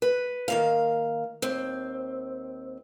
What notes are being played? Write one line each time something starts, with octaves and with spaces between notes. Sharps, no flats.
B4
D#3 A#3 F5
D#2 C4